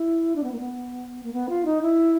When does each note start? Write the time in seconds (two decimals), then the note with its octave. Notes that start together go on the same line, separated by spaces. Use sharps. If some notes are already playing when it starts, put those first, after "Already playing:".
Already playing: E4
0.35 D4
0.43 B3
0.51 A#3
0.59 B3
1.23 A#3
1.33 B3
1.49 F4
1.65 D#4
1.81 E4